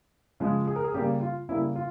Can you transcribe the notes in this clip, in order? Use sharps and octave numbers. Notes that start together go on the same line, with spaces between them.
C#3 F3 G#3
G#4
A#4
G#4
C#3 G3 A#3 G4
F4
C#3 G3 A#3 E4
F4